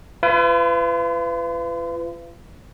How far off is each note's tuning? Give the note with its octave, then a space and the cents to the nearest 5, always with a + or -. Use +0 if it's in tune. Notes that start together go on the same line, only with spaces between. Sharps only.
F4 -40 B4 +30